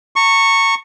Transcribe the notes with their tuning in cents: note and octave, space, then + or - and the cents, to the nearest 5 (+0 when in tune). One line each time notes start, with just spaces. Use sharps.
A#5 -35 C#6 -5